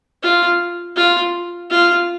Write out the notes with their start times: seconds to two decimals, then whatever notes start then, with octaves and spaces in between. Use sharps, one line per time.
0.23 F4
0.97 F4
1.71 F4